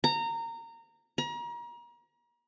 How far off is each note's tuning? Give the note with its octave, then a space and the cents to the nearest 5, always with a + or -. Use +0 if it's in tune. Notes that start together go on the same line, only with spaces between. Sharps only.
A#5 -20
A#5 +35